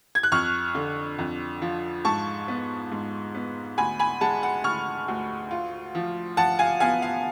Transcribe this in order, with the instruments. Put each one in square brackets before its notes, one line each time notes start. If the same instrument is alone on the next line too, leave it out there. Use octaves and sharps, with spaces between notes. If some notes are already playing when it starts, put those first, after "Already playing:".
[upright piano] G#6
F#6
F2 C#6 F6
D3
F2
F3
G#2 A5 C#6
B3
G#2
B3
D2 G#5 B5
G#5 B5
G#3 F#5 A5
F#5
D2 C#6 F6
D2
F4
F3
F3 F#5 A5
F5 G#5
B3 F5 G#5
F5